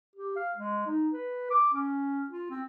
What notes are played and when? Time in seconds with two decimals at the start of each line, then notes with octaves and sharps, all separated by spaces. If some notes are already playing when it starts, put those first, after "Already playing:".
0.16 G4
0.36 F5
0.55 G#3
0.86 D#4
1.13 B4
1.50 D6
1.74 C#4
2.30 F4
2.50 C4